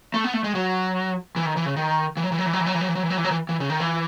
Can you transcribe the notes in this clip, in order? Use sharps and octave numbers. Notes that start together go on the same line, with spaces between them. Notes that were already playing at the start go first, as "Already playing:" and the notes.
A3
B3
A3
G#3
F#3
E3
D#3
E3
C#3
D#3
E3
F#3
E3
F#3
E3
F#3
E3
F#3
E3
F#3
E3
F#3
E3
F#3
E3
F#3
E3
E3
C#3
D#3
E3